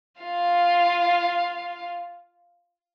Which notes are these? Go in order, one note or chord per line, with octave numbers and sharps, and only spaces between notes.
F4 F5